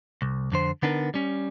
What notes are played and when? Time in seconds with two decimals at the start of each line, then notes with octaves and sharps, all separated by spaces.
0.22 C2
0.52 F2 D3 C5
0.82 D3 B3 D4 D#4 A4 A#4
1.14 G3 C#4